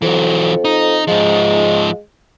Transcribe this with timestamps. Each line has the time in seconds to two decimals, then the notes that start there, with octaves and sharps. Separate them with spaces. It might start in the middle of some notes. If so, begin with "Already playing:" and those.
0.02 F2 E3 F#3
0.65 D#4
1.07 G#2 F3 G#3